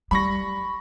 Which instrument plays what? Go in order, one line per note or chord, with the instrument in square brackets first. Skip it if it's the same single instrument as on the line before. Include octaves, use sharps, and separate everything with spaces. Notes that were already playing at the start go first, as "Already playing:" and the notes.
[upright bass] G3 [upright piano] B5 C#6 A#6